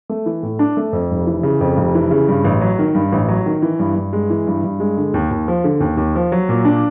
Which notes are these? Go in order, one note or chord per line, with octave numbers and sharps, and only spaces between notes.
A3
E3
A2
D4
A3
F2
F1
E3
C#3
F2
F1
E3
C#3
G2
A1
F#3
D#3
G2
A1
F#3
D#3
E3
G2
G2
G#3
E3
G2
G2
G#3
D3
D#2
D#2
F3
D3
D#2
D#2
F3
F#3
A#2
D4